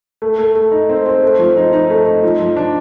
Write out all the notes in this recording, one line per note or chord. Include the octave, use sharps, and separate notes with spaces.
A3
A3
A3
D#4
C4
C4
A3
F3
D#4
D#4
A3
D#4
F3
F3
D4